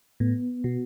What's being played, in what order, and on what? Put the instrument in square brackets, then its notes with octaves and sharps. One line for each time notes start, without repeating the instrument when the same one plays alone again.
[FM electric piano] A2 [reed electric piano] B3
[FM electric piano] B2 [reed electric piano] F#4